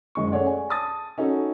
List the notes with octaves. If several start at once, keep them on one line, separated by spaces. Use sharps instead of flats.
F#1 G#3 C#6
A3 C#4 G#4 C#5 D5 F#5
G#5
A5 D#6 A6
C#4 D#4 F#4 A4